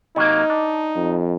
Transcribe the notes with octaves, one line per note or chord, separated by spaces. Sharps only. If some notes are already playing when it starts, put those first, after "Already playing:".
C3 F#3 A#3 D#4 D#5
D4
F2